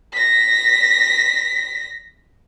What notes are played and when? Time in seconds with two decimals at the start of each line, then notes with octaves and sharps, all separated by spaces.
0.13 A#6 B6